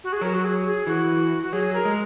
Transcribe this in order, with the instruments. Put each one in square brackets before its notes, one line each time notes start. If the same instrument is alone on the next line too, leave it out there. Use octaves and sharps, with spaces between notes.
[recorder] F#4
G#4
[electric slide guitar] F#3 [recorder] A#4
[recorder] F#4
G#4
G#4
[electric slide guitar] E3 [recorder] F#4
[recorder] F#4
[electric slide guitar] F#3 [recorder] G#4
[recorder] A#4
[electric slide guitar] G#3